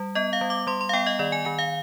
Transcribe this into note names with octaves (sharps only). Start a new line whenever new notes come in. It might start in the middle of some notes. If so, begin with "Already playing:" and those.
Already playing: G3
B3 D#5
F5
G3
D6
G3 C6
C6
F5
B3 G5
D#5
D#3 D5
G#5
D#3 G#5
F5